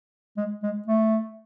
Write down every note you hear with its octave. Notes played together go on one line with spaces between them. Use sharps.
G#3
G#3
A3